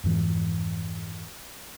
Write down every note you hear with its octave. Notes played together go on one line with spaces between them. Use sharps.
F2 G#2 E3